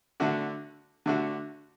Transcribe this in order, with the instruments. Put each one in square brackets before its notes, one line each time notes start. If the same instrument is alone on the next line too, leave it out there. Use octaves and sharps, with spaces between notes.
[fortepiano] D3 A3 D4 F#4
D3 A3 D4 F#4